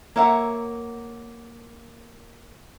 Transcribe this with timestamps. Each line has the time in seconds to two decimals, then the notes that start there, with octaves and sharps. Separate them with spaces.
0.16 A#3 C#5 E5 F#5